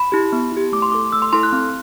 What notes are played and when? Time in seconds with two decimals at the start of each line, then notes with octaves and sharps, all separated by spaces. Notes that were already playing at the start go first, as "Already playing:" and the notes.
Already playing: B5
0.12 E4 G4
0.32 B3
0.52 E4 G4
0.72 A3 D6
0.82 C6
0.92 E4 A4 D6
1.12 A3 E6
1.22 C6
1.33 E4 A4 C6
1.43 F#6
1.53 C4